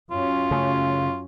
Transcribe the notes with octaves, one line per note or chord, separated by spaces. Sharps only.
F#2 C#4 F4
C#3 A3